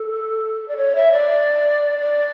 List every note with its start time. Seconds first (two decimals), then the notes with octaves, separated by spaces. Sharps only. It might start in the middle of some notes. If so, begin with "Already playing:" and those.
Already playing: A4
0.68 D5
0.77 C#5
0.96 E5
1.12 D5
1.99 D5